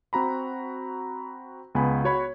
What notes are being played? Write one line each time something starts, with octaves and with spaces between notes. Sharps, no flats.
C4 F#4 A#5 B5
C#2 B3 G#5 B5
F#4 C#5 B5